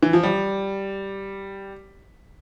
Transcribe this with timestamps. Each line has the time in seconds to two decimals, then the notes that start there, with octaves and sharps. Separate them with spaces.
0.03 E3
0.13 F3
0.23 G3